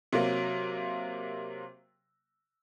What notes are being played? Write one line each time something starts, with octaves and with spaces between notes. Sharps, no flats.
C3 F#3 A#3